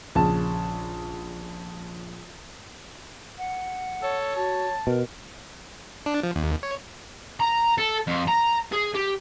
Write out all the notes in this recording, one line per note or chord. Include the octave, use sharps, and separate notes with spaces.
A#1 C#3 A5
F#5
A4 C#5
F#4 A5
B2 A#4
D4
F3
D#2
C#5
A#5
A4
F2
A#5
G#4
G4